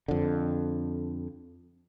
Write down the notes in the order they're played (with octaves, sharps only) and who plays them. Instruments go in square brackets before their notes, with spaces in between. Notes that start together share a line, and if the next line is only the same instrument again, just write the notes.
[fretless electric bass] F2 D3